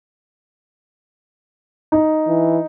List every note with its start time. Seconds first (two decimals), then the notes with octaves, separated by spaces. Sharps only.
1.92 D#4
2.28 E3